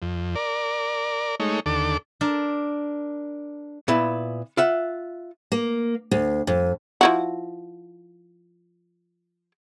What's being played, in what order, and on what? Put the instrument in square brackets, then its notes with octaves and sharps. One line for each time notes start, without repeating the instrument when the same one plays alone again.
[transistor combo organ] F2
A#4 D5
G#3 A3 D#4 C#5
D#2 D3 A4 D6
[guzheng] D4 A#4 A5
[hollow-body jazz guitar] A#2 B3 E4
F4 E5 F#5
[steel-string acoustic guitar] A#3
D2
F2
[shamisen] F3 E4 F#4